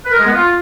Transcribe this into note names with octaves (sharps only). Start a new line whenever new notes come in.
B4
A#4
G#3
B3
F4